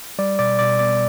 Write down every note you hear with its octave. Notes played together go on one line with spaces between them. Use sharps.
G3 D5
B2 D5
B2 D5
B3 D5